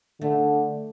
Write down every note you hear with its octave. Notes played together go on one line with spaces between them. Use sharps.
D3 A3